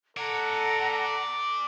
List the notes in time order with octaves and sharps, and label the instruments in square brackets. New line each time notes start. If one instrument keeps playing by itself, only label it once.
[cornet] A4 [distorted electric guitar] D5 G#5 [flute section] F#5 A#5